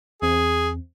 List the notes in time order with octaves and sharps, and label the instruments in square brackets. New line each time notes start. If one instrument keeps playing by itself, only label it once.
[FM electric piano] E2 C4 [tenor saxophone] G#4